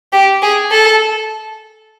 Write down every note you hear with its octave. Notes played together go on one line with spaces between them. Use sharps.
G4
G#4
A4